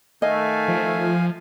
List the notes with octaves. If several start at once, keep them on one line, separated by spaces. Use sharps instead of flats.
D#3 A3 D#5 F5 G#5
F3